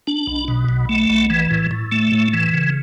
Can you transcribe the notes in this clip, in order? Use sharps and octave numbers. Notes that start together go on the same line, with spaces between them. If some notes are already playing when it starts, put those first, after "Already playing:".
D4
B1
B2
B1
A3
B1
E3
A2
A2
A3
A2
E3
C#3